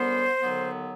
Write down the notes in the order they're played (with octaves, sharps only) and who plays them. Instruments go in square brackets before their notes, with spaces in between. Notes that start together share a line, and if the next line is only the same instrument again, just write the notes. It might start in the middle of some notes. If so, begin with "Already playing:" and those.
Already playing: [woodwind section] F#2 D3 G3 B3 [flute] C5
[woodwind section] D#2 D3 F#3 B3